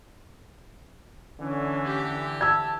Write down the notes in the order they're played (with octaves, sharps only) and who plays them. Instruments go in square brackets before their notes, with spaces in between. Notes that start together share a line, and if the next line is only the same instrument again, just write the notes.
[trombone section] D3 E3 [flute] C#4
[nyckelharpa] G4
[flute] A5 [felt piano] E6 G#6